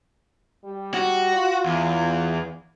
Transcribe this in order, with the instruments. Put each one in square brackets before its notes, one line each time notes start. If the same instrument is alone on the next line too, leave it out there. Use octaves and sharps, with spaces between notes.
[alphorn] G3
[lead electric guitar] F#4
[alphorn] F4
[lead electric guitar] E2